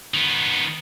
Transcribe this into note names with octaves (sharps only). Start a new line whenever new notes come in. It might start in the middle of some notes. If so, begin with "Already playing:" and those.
D#3 B3